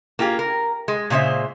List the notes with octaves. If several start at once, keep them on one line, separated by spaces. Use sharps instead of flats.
A#3 F4 G4 G#4
A#4
G#3
A#2 C#3 G#3 C5 E5